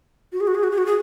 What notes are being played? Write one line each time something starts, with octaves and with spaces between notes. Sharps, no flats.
F#4
G#4
F#4
G#4
F#4
G#4
F#4
G#4